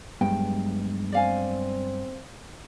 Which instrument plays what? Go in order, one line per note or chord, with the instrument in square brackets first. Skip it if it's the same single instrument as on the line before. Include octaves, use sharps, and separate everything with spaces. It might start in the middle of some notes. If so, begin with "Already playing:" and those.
[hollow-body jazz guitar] G2 [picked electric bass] F#3 G#3 B3 [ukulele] G5
[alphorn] C4 [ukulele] D5 F5 G#5